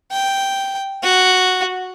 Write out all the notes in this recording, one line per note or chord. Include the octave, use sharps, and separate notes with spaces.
G5
F#4